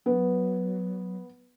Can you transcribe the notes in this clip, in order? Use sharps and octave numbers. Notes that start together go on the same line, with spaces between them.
F#3 B3